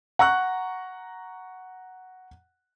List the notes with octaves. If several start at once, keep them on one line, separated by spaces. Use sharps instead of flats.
F#5 A#5 C#6 F#6